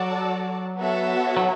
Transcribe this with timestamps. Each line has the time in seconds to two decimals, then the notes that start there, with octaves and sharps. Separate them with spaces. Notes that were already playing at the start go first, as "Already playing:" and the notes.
Already playing: F#3 F#4 A4 D5 A5
0.76 B3 F#4 A4 C#5 E5
1.37 F#3